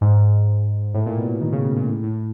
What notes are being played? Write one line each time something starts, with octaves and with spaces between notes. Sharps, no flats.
G#2
A2
A#2
B2
D#3
C#3
B2
A#2
A2
A2